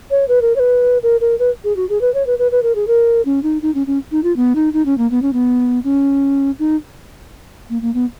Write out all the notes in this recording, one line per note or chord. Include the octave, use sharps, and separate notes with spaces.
C#5
B4
A#4
C#5
B4
A#4
A#4
B4
G#4
F#4
G#4
B4
C#5
B4
B4
B4
A#4
G#4
A#4
C#4
D#4
D#4
C#4
C#4
D#4
F4
B3
D#4
D#4
C#4
A#3
B3
C#4
B3
C#4
D#4
A#3
A#3
B3